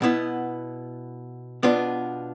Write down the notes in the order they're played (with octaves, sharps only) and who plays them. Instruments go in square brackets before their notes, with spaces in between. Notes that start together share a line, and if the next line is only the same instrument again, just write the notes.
[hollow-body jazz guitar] B2 B3 E4
B2 B3 D4 F4